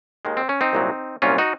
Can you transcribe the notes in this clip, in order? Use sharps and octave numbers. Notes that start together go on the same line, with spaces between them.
D#2 D#3 G#3
C4
C#4
C4 D#4
C2 A#2 F#3
C2 A#2 F#3 C#4 F4
D#4 F#4